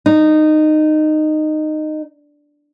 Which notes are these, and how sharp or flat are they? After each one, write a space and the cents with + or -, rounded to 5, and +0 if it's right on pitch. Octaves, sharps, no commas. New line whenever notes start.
D#4 -15